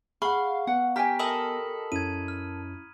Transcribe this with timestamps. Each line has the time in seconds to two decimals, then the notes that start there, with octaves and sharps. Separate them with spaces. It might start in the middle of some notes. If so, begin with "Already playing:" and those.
0.22 G#4 F5 F#5 B5 C#6
0.67 B3 F#5
0.96 G4 G5 G#5 A#5 F6 B6
1.19 A4 A#4 D#5 B5 D#6 F#7
1.92 F#2 C#4 E4 G#6 D#7
2.28 F6